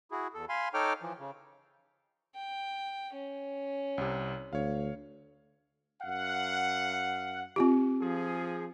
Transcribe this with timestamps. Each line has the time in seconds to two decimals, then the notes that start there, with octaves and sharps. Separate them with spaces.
0.11 E4 F#4 G#4
0.34 E2 A4
0.49 F5 G#5 B5 C6
0.74 D#4 A4 C#5 G5 D6 F6
1.01 E3 F3
1.19 C#3
2.35 G5
3.14 C#4
3.98 C2 C3
4.53 D2 C#5 F5
6.01 F#2 F5 F#5
7.56 C4 F4 G4
8.01 F3 G#4